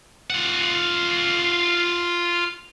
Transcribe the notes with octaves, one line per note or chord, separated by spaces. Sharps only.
F4 F#5